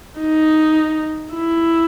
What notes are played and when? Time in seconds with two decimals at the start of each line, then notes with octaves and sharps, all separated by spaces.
0.20 D#4
1.34 E4